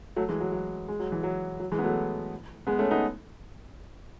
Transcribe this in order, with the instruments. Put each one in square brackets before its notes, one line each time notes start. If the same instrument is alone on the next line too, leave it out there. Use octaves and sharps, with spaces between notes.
[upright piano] F#3 A3
E3 G#3
F#3
F#3
G#3
F#3
E3
F#3
F#3
E3 G#3
B3
F#3 A3
G#3 B3
A3 C#4
B3 D#4